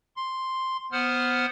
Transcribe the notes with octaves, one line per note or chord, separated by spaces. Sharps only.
C6
B3 C5 F#5 F6